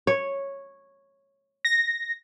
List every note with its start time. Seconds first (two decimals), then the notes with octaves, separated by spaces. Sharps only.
0.07 C#5
1.65 A#6